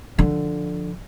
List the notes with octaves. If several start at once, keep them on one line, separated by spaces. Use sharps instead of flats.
D3 F3